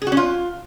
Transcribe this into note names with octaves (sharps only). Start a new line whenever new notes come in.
G#4
F#4
C#4
F4